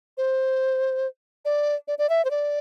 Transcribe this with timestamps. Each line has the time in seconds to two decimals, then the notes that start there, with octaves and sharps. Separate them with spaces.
0.18 C5
1.45 D5
1.88 D5
1.99 D5
2.09 E5
2.25 C5
2.31 D5